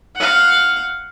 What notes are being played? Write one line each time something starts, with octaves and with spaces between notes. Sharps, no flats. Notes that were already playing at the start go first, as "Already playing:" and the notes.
F5 F#5